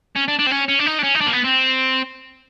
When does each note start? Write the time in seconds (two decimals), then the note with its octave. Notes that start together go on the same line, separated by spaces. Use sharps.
0.16 C#4
0.28 D4
0.39 D4
0.47 C4
0.51 C#4
0.69 C#4
0.79 D4
0.87 D#4
0.99 D4
1.04 C#4
1.15 D#4
1.21 D4
1.27 A#3
1.33 B3
1.44 C4